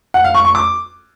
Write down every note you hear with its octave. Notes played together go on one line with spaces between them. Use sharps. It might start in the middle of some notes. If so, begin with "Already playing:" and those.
F#5
F5
C#6
C#6
D6